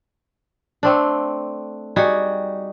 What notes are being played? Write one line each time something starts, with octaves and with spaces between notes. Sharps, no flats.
A3 C4 D4
G3 D#4 F#4 G#4